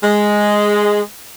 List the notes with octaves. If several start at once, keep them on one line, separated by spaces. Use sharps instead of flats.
G#3